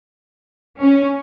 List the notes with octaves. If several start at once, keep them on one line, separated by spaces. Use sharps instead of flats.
C#4